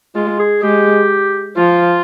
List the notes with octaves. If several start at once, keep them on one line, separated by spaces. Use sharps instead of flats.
G#3 F4
G#4
G#3 G4
F3 F4